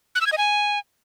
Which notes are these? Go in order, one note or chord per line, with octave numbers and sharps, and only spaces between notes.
F#6
E6
G#6
D#5
G#5